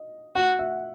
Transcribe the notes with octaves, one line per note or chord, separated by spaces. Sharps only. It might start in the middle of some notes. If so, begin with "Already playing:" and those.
Already playing: D#5
F#4 F#5
E5